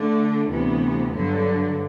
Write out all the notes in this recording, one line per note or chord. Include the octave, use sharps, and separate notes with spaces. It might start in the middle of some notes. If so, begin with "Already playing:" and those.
Already playing: D3 A3 D4
D2 C3 E3 B3
G2 D3 F#3